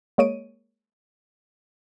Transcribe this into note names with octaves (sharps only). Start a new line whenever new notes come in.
G#3 A#3 C#5 D#5 D7 D#7